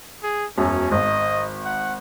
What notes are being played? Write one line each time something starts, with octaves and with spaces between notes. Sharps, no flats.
G#4
E1 F#2 C#4
G#1 D#5
F#5